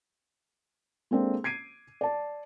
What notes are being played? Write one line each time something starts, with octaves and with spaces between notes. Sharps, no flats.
G#3 A#3 C4 D4 A4
G#6 C7 D7 D#7
D5 A5